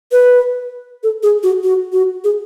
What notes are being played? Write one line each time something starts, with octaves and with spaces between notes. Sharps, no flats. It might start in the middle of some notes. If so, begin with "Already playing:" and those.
B4
A4
G#4
F#4
F#4
F#4
G#4